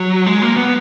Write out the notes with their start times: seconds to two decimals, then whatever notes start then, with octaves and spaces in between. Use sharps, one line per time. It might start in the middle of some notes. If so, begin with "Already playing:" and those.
Already playing: F#3
0.26 G#3
0.42 A#3
0.57 B3